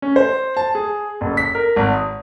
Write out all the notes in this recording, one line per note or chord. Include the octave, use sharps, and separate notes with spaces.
C#4
C5
A5
G#4
F#1
B6
A#4
G#1
D#6